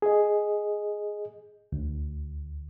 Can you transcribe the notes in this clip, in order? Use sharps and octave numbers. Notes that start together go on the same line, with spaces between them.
G#4 D#5
D2